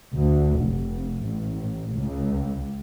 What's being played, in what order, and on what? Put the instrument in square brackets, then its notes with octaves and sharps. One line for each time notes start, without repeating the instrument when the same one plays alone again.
[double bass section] D2
F1
A1
C#2